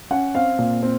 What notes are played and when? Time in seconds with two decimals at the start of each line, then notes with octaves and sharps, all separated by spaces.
0.11 C#4 F#5
0.35 C4 F5
0.59 A#2
0.83 C4